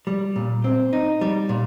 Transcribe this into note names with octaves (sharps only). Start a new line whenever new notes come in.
G3
A#2
C4
D#4
G3
A#2